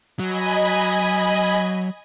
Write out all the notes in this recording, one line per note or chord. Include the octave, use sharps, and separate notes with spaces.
F#3 D#5 G#5 B5